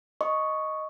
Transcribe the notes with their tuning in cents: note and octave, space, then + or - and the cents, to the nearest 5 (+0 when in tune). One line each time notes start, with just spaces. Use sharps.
D#5 +0 C#6 +0